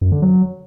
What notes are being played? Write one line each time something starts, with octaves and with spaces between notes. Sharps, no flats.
F#2
D3
F#3